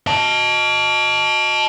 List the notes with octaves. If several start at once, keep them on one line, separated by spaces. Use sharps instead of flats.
D#5 A5